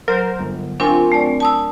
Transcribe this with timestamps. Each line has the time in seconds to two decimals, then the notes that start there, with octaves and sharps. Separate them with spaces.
0.08 F#3 A#4 C5
0.39 G1
0.80 C4 D4 F4 A#4 G#5 C#6
1.12 A3 D5
1.40 A5 D#6 E6